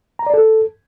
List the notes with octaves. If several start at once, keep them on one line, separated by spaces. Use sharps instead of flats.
A#5
D5
A4